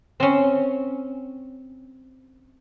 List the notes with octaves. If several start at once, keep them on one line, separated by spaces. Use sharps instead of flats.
C4 C#4